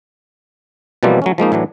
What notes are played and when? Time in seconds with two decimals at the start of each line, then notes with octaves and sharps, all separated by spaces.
1.03 B2 E3 F3 G3 A#3 C4
1.22 F#3 A3 C#4
1.38 F3 G#3 A#3 D#4
1.52 A2 E3 F#3 D4